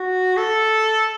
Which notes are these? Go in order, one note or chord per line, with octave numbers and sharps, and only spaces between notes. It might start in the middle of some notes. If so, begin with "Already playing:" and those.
Already playing: F#4
A4